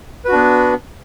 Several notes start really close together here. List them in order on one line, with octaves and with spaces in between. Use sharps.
B4 F#4 D4 B3